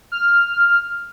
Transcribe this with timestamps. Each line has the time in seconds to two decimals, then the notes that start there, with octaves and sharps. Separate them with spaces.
0.12 F6